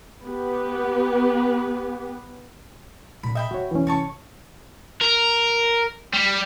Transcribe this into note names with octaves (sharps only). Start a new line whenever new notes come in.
B3 G4 B4
A#2 C#4 B5
D#5 E5 G5 B5
F2 F#4 C#5
E2 B2 E3 C#4
G#1 C3 C#5 A5 C#6
A#4
G3